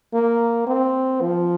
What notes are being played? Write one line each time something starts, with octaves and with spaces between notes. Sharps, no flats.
A#3
C4
F3